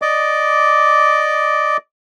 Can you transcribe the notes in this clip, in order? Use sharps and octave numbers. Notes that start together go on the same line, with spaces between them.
D5 D#5 D6